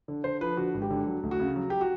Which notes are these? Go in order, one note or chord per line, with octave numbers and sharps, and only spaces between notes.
D3
D3 C5
F3 B4
D3 F#4
G#1
G4
D3
F#3
D2
F#4
C#3
F#3
F#3 G4
F#4